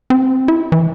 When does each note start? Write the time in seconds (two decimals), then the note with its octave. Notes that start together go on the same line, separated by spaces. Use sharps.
0.10 C4
0.48 E4
0.72 E3